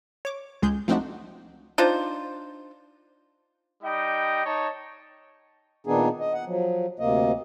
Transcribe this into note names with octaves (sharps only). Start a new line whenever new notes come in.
C#5 D6
C#2 G#3 G#4 G6
F3 A3 C4 D4 D#4 F#4
D4 D#4 F4 C5
G3 D#4 D#5 G5
D#4 C#5 D#5 A5
A#2 D#3 B3 D4 D#4 G#4
D#5
F#5
F3 F#3
D2 C3 A#3 D#5